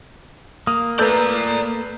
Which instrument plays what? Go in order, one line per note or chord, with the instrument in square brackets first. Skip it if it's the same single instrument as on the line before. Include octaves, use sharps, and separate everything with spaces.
[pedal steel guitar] A#3 [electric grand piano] D#6
[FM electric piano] A3 A4 [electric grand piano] B4 E6 G6 [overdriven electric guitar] D5 A#5